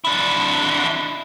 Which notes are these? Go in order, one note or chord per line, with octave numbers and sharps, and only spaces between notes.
D4 E4